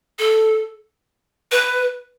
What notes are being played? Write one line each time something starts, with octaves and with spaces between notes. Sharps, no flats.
A4
B4